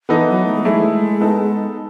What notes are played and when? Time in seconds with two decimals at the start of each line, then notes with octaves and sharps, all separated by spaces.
0.09 E3 B3 D#4 A4
0.28 F#3
0.46 A3
0.54 G#3
0.64 F#3 A3 E4 G#4
0.71 G#3
1.20 B3 D#4 A4